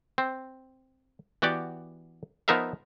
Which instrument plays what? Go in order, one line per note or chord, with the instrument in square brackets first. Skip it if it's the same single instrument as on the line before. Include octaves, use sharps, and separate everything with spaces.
[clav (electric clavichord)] C4
E3 B3 F#4 G4 D5
F3 B3 D#4 A#4 E5 F5